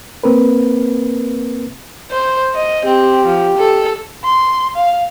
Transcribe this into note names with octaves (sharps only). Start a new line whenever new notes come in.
A#3 C4 A#4 B4
C5
D#5
C4 G4
F3
A4
C6
F5